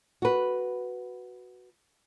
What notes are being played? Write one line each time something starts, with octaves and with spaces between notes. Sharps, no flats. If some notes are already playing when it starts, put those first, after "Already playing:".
F#4 B4